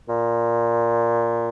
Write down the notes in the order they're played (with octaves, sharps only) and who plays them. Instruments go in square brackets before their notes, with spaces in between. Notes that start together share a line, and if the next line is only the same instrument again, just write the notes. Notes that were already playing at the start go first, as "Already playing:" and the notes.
[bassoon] A#2